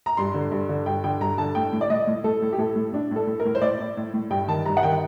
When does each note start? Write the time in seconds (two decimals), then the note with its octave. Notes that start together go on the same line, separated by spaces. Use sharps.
0.06 A#5
0.17 G2 C6
0.34 D3
0.51 G2
0.69 D3
0.86 G2 G5
1.04 D3 G5
1.21 G2 A#5
1.38 D3 A5
1.55 A2 G5
1.73 A2
1.81 D5
1.90 A2 D#5
2.07 A2
2.24 A2 A4
2.42 A2
2.53 G4
2.58 A2 A4
2.76 A2
2.93 A2 D4
3.11 A2 A4
3.27 A2
3.40 A#4
3.45 A2
3.55 C5
3.62 A2 D5
3.80 A2
3.97 A2
4.14 A2
4.30 G2 G5
4.48 D#3 A5
4.66 G2 A#5
4.77 F#5
4.83 D#3 G5